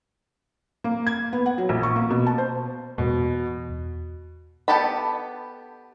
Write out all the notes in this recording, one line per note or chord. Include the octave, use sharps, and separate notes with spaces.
A#3
G#6
B3
F#5
F#3
A#1
C#6
A#3
B2
A5
C5
E2 B2
B3 G4 A4 A5 B5